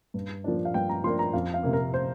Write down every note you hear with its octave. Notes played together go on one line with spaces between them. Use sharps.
G2
F3 A#3 D4
F5
G2 G5
A#5
F3 A#3 D4 C6
A#5
F2 F5
F5
C3 A#3
A#4
C5